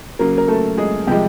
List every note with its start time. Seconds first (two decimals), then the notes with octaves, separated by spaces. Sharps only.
0.19 C#3 F#3 A#3 A#4
0.38 A#4
0.48 A3 A4
0.78 G#3 G#4
1.07 C3 F3 G3 G#3 G4